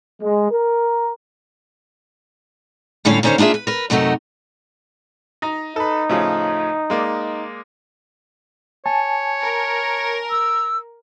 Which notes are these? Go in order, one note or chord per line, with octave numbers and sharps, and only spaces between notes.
G#3
A#4
A2 D3 G3 C#4 C#5 F5
D#2 D3 C#4 C5 C#5 F5
A#3 D4 F4 G#4 E5
B4
A#4 B4
F#2 C3 A3 D#4 F#4
D#4 A#5
D#4 A4 B4
A2 C#3 F3
G#3 A#3 D5
C#5 G#5 A5
A#4
E6